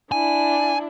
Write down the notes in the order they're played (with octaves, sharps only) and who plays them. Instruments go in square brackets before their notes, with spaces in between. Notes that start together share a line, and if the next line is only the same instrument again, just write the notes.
[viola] D4 E4 [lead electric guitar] G#5